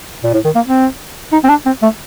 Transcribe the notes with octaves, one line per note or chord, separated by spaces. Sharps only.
A#2
A2
D#3
A#3
C4
D#4
C4
D4
C4
A3